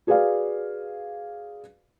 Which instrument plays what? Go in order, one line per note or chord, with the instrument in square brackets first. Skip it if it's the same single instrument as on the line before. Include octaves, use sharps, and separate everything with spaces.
[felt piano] F#4 G#4 B4 D5 F5